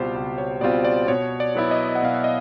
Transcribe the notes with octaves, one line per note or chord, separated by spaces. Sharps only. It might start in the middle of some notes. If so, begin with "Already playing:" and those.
Already playing: C#2 B2 G3 C4 F4 G4 C5
C#2
C#5
B2 G3 C4 F4 D5
D5
B2 C#5
D5
F#3 B3 E4
D#5
F#5
B2 F5
E5
D#5